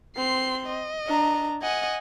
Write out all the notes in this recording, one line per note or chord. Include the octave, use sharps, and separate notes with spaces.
C4 C6 C7
D#5
D4 A#5
D#5 F#5 G#5